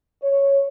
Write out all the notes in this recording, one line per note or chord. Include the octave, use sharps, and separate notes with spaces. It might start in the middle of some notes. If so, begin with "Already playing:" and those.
C#5